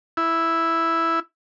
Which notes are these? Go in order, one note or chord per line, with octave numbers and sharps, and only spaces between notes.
E4